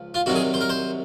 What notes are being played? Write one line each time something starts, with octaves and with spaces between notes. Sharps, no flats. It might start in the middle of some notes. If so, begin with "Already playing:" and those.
Already playing: C#2 F3
F4
C2 C3 D#3 F#3 F#4
G#4
C5
A#4
C5